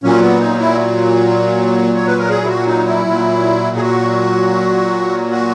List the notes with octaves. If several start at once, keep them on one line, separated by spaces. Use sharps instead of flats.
A#2 F#3 C#4
B3
D#4
E4
C#5
B4
A#4
G#4
E4
F#4
D#4
E4
A#2 F#3
G#4
F#4
F#4